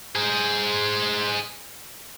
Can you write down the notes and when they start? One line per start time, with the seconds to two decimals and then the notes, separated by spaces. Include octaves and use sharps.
0.15 G#4 C5